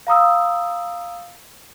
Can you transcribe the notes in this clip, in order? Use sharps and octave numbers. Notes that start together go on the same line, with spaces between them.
F5 A#5 D#6 E6